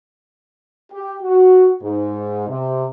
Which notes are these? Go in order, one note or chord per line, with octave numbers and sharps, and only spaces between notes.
G4
F#4
G#2
C3